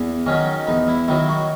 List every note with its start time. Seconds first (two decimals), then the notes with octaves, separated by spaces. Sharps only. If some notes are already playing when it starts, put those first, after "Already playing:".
Already playing: E2
0.26 D#3 F#3 C#4
0.67 E2 D#4
0.88 E4
1.08 D#3 F#3 E4
1.29 F#4